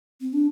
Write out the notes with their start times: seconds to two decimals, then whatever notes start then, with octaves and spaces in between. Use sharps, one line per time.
0.21 C4
0.33 D4